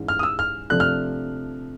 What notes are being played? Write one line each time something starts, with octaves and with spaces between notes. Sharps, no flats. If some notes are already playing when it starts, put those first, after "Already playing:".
Already playing: G#2 E3 C#4
F6
D#6
E6
F6
C3 F3 A3 D4 F#6
F6